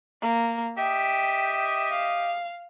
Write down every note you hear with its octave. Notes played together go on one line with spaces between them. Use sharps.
A#3
G4 D#5 E5 G5
F5